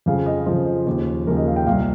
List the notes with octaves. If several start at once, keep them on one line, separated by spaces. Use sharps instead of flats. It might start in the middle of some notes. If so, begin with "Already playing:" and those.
F2 C#3 F3 F5
D#5
F2 C#3 F3 C5
D#2 C#3 F3
D#2 C#3 F3 A#4
D#5
F5
G5
C2 A#2 F3 F5